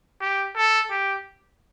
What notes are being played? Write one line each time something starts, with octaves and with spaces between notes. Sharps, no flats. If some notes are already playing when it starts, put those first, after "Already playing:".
G4
A4
G4